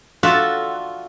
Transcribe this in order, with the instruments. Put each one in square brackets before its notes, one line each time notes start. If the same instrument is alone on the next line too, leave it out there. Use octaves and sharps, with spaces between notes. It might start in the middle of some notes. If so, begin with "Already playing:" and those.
[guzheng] F4 F#4 A4 D5 E5 F#5